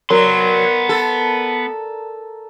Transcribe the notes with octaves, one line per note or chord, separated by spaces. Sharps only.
F#3 B3 A#4 D5 C6
A4